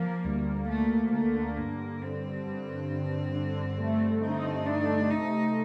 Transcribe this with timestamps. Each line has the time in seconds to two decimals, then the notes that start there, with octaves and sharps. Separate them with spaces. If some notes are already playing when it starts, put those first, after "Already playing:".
Already playing: F3 A#3
0.24 D2 G3
0.68 D2 A3
1.12 D3 A3
1.56 G2 A#3
2.01 G2 C4
2.46 G2
2.90 G2
3.34 D3
3.78 A3
4.21 C4 D#4
4.66 A3 D4
5.10 C3 D#4